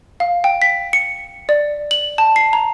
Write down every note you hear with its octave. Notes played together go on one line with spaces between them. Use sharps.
F5
G5
B6
C#7
D5
F#7
A5
C7
A#5